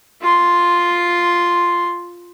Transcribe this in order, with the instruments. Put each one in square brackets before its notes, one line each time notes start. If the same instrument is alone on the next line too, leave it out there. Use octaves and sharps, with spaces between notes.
[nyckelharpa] F4 C6